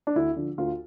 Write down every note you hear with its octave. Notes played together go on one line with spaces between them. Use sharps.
D4
D2 E4
D3 F3
D2 F4